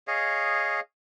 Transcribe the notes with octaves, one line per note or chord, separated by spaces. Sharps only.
G#4 C#5 D#5 F5